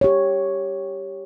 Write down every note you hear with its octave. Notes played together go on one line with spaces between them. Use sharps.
G4 C#5